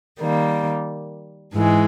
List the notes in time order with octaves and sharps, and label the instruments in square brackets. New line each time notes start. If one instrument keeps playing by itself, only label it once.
[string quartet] D#3 G3 A#3
G#2 E3 G#3